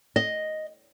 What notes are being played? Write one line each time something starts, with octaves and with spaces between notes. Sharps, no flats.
D#5